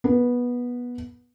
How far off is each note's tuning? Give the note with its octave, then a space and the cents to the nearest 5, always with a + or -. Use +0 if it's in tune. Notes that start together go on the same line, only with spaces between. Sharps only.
B3 -15